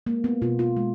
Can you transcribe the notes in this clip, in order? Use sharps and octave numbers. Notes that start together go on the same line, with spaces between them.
G#3 A#3
B3
B2 F4
F4
G#3